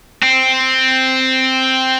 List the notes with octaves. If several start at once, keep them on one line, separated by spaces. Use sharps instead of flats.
C4